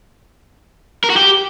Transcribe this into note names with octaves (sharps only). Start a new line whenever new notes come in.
A#4
F#4
G4